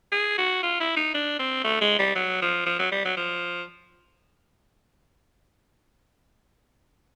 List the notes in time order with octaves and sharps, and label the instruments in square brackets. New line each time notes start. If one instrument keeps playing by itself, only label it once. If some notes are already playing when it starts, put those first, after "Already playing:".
[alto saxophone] G#4
F#4
F4
E4
D#4
D4
C4
A3
G#3
G3
F#3
F3
F3
F#3
G3
F#3
F3